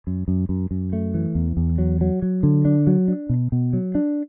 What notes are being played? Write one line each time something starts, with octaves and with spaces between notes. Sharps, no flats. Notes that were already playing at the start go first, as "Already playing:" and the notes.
F#2
F#2
F#2
F#2
A3
E3
E2
E2
F#3
F#3
F#3
D3
D4
F#3
D4
B2
B2
F#3
D4